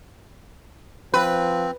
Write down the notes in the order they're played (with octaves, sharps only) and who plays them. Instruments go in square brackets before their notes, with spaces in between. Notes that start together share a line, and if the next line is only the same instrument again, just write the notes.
[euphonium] F3 [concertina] C4 [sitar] B4